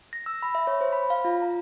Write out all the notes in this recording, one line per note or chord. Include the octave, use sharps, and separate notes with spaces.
A#6
E6
B5
E5
C#5
C5
B5
F5
F4
A#5